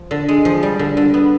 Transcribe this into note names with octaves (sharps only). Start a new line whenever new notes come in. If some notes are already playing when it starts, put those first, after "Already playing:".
Already playing: F3
D3
G#3
F3
G3
D3
D3
B3